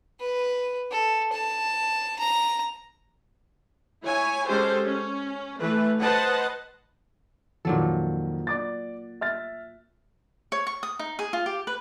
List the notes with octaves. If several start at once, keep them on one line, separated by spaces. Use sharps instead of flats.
B4
A4
A5
A#5
E4 C#5 G#5
G#3 C#4 G4 A4 C5
C#4
E3 A3 B4
B4 C5 D#5 F#5 A5
F2 A#2 D#3 F#3 A4
D5 D6 A6
E5 F6 A6
C#5
C#6
D#6
D#4
G#4
F4
G4
B4